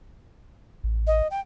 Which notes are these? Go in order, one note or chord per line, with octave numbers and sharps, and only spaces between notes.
A1
D#5
G5